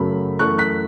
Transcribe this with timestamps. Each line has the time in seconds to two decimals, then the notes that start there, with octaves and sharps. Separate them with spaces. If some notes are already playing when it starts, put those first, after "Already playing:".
Already playing: F#2 C#3 F#3 A3 B5
0.39 F#2 E3 A3 C#6 F#6
0.58 F#6 B6